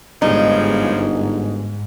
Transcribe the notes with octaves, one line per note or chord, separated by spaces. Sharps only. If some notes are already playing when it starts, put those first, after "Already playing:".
G1 E2 G#2 C#3 F3 D#4